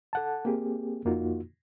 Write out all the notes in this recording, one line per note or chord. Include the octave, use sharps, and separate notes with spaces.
A4 F#5 A5
A#3 C4 G4 G#4
F2 A#3 D#4 F4 F#4